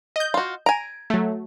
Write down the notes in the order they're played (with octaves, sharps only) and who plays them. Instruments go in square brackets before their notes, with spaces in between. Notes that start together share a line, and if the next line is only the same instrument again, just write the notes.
[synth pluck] D#5 G6
[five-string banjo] F4 F#4
[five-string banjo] G#5 A#5 [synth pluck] D7
[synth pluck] F#3 A3